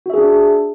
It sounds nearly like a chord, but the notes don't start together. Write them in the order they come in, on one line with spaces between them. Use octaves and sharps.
F#4 E5 G#4 D4